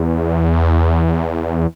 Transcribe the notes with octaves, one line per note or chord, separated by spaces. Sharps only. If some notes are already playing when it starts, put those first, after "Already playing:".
Already playing: E2